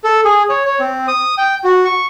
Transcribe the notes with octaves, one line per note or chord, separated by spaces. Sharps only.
A4
G#4
C#5
C#5
C4
D#6
G5
F#4
C#6